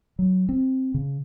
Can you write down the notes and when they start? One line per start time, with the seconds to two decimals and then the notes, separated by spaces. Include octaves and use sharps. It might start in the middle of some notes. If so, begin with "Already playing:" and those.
0.19 F#3
0.49 C4
0.94 C#3